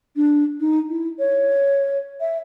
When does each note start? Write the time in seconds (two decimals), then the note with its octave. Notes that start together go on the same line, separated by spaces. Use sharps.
0.16 D4
0.60 D#4
0.89 E4
1.19 C#5
2.20 E5